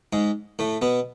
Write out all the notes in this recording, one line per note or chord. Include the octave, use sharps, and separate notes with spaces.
G#2 G#3
A2 A3
B2 B3